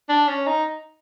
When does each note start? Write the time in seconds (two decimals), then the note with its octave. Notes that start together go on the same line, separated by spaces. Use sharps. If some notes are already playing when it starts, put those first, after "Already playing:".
0.09 D4
0.28 C#4
0.46 D#4